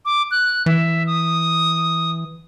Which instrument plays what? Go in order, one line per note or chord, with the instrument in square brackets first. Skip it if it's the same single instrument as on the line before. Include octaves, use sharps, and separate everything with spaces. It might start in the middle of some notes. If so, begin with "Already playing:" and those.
[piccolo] D6
F#6
[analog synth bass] E3 [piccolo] E5
[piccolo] D#6